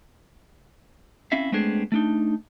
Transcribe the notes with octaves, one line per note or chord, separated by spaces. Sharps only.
C4 C#4 E4 E5 F5
G#3 A3 B3 C4 D4 G#4
A3 D4 D#4